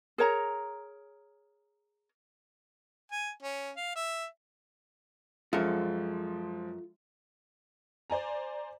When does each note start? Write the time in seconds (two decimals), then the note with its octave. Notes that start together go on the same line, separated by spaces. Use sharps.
0.18 G#4 A#4 C#5 A#5
3.12 G#5
3.43 C#4
3.76 F5
3.96 E5
5.53 F#2 F3 G#3 F4 A4
8.10 C5 D5 G#5 A#5